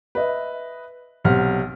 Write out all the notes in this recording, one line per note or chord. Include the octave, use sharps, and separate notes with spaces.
B4 D#5 E5
B1 C3 C5 F#5 F6